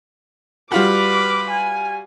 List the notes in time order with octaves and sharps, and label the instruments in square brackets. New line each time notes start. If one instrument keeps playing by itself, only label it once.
[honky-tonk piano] G3 F4 F#4 [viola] B4 B5 [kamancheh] D6
[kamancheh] G#5